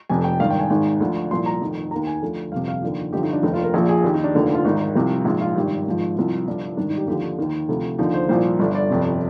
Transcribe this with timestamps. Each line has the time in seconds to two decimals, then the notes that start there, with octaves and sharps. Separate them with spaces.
0.10 F1 F2 C3 G#5
0.24 G5
0.40 G#1 G2 D#3 F5
0.50 G5
0.60 G#5
0.70 G#1 G#2 D#3
1.00 D2 D3 F3
1.31 C2 A#2 F3 C6
1.46 A#5
1.61 F1 F2 D#3
1.91 D#2 D#3 A#5
2.07 G#5
2.22 D2 D3 F3
2.52 G1 F2 C3 F5
2.68 F5
2.82 D#2 D3 F3
3.12 G1 G2 D3 F3 G4
3.23 D#4
3.33 D4
3.43 F1 D#2 D#3 D#4
3.53 F4
3.64 A#4
3.74 A#1 A#2 F3 G#4
3.89 G#4
4.04 D#2 D#3 G4
4.14 D#4
4.24 D4
4.34 F1 D#2 D3 F3
4.55 F4
4.65 G#1 G#2 D#3 D#4
4.95 C2 C3 F3
5.25 A#1 G#2 F3 F4
5.41 F4
5.55 G#1 G2 D#3 G4
5.86 G#1 G#2 F3
6.16 C2 C3 F3 F4
6.47 G1 G2 F3
6.77 G#1 G2 D#3 D4
6.88 D#4
6.97 G4
7.07 D#2 D3 F3 G4
7.23 D#4
7.39 D#2 D#3
7.69 D2 C3 F3
7.98 D#2 D3 F3 D#4
8.14 C5
8.29 C2 A#2 F3 C5
8.59 G1 G2 D3 D5
8.75 D5
8.90 G1 F2 C3